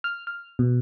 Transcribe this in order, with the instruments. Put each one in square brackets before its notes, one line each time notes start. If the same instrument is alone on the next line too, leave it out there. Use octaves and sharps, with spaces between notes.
[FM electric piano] F6
F6
B2